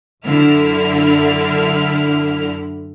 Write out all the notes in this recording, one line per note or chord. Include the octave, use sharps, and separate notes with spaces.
F#2 D3 E4 F6